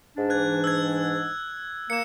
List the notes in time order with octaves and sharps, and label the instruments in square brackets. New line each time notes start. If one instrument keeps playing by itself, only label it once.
[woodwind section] G#2 E3 D4
[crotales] F#6 G#6
E6 G#6
[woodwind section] A#3 [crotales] C#7 E7